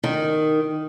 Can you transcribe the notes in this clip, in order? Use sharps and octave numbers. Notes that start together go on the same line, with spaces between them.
D#3